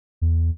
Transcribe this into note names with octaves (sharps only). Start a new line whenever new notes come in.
E2